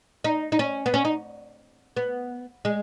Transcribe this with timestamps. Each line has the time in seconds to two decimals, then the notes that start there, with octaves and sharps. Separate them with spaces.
0.24 D#4
0.52 D#4
0.59 C#4
0.86 B3
0.94 C#4
1.05 D#4
1.96 B3
2.65 G#3